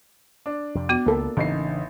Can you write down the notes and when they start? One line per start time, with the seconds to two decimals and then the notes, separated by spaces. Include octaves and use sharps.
0.46 D4
0.75 F2 C3
0.89 B3 F#4
1.06 C#2 A#3 A4
1.37 A1 C#3 E3 D4 D#4 C7